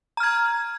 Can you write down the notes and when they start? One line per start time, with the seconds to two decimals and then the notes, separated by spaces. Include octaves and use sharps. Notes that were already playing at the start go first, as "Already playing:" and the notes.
0.17 A#5
0.20 F6
0.23 G#6